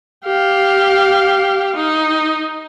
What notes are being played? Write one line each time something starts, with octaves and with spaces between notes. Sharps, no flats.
G4 F5
D#4